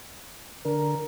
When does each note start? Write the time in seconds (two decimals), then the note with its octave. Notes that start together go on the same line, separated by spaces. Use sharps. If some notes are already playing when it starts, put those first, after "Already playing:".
0.65 D3 A#4